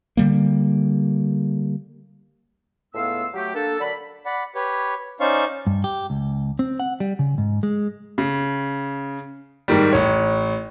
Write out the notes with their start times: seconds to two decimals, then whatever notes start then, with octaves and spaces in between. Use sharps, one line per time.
0.17 D3 G3 A#3
2.95 C#2 A2 B3 F5 C6 E6
3.34 F#3 A3 G4
3.55 A#3 D4 A4
3.80 D3 F#3 A#4 D5 B5
4.26 D5 F#5 B5
4.55 G4 B4 C#5
5.20 C#4 D#4 C5 D5 F5 C#6
5.67 G2
5.84 G4
6.10 C#2
6.59 C4
6.80 F#5
7.00 G3
7.19 C#3
7.38 G#2
7.63 G#3
8.18 C#3
9.68 G#2 D#3 G3
9.93 A1 C#5